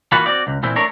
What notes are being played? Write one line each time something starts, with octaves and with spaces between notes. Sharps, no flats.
E3 A#3 F4 F#4 B4
C4 F#4 D5
C#2
A#2 E3 C4 E4
A3 D4 A#4 C#5